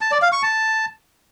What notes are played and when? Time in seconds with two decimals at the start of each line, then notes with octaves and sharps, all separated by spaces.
0.01 A5
0.12 D5
0.22 F5
0.32 C#6
0.43 A5